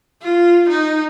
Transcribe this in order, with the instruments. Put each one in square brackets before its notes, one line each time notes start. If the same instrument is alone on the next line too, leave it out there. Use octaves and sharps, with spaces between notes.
[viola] F4
D#4